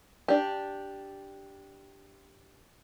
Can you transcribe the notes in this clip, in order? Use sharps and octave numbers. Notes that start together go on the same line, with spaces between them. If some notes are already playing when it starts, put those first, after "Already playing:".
D4 G4